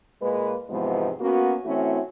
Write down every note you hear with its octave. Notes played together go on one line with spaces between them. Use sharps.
A#2 G#3 A#3 B4
E2 G#2 C3 F3 G#3 B3
A#3 B3 C#4 F#4
E3 A3 C4 C#4 E4 F#4